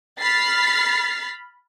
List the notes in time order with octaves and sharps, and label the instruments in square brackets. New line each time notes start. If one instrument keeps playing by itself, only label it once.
[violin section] B5 F6 A6 B6 C7